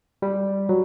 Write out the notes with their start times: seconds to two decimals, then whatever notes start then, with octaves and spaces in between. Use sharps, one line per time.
0.22 G3
0.69 F#3